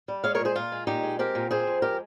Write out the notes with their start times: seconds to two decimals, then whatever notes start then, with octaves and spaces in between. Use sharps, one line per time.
0.08 G3
0.24 G#3 C#5 F5
0.35 A#2 A#4 C#5
0.45 G#4 C5
0.56 A#2 F4
0.72 G#3
0.87 A#2 D#4 G4
1.03 G#3
1.19 C4 G4 A#4
1.35 A#2
1.51 C4 G#4 C5
1.67 F2
1.82 G#3 G4 A#4